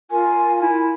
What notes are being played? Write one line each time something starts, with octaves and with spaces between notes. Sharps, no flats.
F4 A#4 G#5
E4